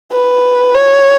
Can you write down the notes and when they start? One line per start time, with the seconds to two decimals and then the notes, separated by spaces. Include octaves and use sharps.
0.12 B4
0.74 C#5